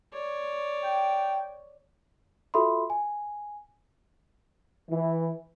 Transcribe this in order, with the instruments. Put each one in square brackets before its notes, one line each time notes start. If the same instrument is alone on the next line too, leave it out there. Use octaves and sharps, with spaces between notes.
[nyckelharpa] C#5 D5
[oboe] G5
[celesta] F4 F#4 A4 E5 B5 C6
G#5
[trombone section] E3